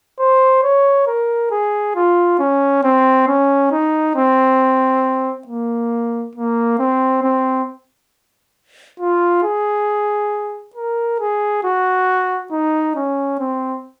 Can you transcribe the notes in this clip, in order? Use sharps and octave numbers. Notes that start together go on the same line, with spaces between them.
C5
C#5
A#4
G#4
F4
C#4
C4
C#4
D#4
C4
A#3
A#3
C4
C4
F4
G#4
A#4
G#4
F#4
D#4
C#4
C4